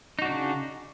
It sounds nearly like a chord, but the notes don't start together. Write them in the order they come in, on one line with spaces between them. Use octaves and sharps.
D#4 F#4 D4 C#3